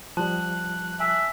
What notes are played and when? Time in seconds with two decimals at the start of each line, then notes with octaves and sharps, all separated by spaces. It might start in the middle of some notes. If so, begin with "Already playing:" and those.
0.17 F3 G3 A5 F#6
1.00 E5 G#5